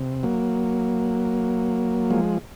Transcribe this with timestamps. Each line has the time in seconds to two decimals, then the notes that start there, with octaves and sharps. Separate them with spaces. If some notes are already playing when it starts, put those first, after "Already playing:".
Already playing: C3
0.23 F#3 A#3
2.10 F3 G#3